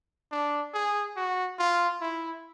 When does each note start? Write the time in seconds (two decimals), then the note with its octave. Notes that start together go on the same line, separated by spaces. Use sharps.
0.32 D4
0.74 G#4
1.16 F#4
1.59 F4
2.01 E4